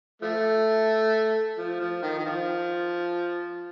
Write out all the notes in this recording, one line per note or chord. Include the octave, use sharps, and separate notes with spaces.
F3 A3
F3
F3
D#3
D#3
F3